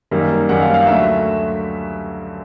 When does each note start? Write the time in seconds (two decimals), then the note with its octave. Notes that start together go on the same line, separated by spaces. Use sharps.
0.11 F#2 D#3 G3 A#3
0.49 F#2 D#3 G3 A#3 F#5
0.61 F5
0.74 F5
0.87 D2 D3 F#3 A3 E5